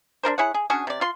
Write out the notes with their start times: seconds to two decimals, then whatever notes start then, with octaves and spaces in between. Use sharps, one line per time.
0.23 D4 F4 A#4 C5
0.38 E4 G#4 C#5 F#5
0.54 G#4
0.70 C#4 D4 F#4 G#4
0.87 C3 D5
1.01 F4 C6